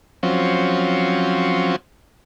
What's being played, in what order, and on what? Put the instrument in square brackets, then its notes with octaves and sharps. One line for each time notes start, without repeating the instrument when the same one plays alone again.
[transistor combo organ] F3 F#3 C4 C#4